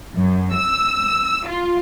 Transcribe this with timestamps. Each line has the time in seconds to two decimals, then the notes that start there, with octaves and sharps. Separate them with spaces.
0.15 F#2
0.54 E6
1.47 F4